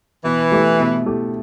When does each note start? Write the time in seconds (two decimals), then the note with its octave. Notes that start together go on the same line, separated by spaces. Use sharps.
0.25 B2 E3
0.52 A3 E4 G4
0.79 B2
1.06 A3 E4 G4